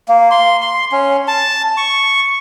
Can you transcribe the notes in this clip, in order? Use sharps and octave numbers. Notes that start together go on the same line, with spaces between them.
A#3
C6
C6
C#4
A5
C#6